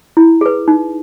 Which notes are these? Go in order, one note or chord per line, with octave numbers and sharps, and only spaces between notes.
E4
G#4 B4
D#4